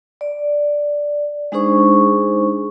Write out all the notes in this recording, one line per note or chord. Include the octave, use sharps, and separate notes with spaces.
D5
G#3 D4 D#4 G#4 C5 C#6